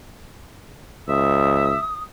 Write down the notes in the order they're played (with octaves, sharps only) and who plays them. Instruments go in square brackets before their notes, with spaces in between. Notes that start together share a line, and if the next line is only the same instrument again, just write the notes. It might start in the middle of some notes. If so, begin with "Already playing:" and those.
[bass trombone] C#2 [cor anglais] E5 [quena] D#6